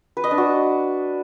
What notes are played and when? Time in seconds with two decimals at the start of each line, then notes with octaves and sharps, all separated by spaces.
0.17 B4
0.24 D#5
0.31 D4
0.38 F#4